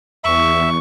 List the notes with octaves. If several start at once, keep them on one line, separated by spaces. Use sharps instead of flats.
E2 E5 C#6